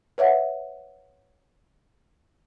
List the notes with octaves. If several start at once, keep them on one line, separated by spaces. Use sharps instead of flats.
B4 C#5 E5 F#5